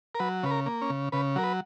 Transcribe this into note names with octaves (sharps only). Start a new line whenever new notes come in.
A#4
F#3 B4
C#3 B4
A#4
A#3
C#4
C#3
C#3 B4
F#3 A#4
B4